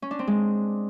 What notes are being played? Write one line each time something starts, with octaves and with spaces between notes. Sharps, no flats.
C#4
D4
C4
G#3